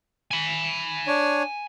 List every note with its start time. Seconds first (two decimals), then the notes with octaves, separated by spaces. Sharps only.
0.31 G#5 B5
1.07 D4 C#5